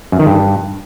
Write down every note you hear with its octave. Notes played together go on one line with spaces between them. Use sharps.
F#2
D#3
G2